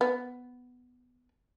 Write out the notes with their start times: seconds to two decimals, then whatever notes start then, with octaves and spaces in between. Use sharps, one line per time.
0.01 B3